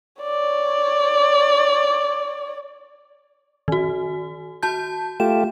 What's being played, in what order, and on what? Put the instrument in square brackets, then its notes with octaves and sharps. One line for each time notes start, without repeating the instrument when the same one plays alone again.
[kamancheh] C#5 D5
[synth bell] D#3 F#4
F#4 A5 G6
[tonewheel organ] A3 F4 G4 [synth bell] E7